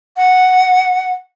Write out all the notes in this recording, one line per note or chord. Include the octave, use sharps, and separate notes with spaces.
F#5